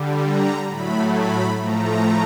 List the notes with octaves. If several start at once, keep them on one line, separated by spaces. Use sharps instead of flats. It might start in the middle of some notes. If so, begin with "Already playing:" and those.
Already playing: D3 G3
A#5
A2 F#3 A3 B5
B5
A2 F3 A3 A#5